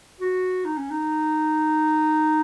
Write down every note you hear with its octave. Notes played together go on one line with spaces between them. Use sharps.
F#4
D#4
C#4
D#4